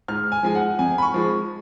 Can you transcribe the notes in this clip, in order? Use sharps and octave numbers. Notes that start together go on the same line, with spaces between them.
G#2 F6
G#5
F3 G#3 G#5
F#5
F2 G#5
B5
C#6
F3 G#3